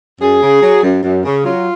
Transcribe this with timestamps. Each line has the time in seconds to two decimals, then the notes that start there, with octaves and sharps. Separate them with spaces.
0.21 F#2 G#4
0.42 C#3
0.62 F#3
0.83 F#2
1.02 F#2
1.24 C#3
1.43 F#3 F4